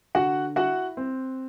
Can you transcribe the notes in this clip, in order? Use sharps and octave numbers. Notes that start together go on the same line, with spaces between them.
D3 F#4 F#5
E4 F#4 F#5
C4